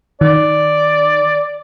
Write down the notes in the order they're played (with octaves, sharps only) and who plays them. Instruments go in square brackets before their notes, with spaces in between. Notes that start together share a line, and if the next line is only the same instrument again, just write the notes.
[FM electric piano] D#3 [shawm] D5